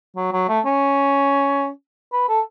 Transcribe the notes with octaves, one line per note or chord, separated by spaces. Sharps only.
F#3
F#3
A3
C#4
B4
A4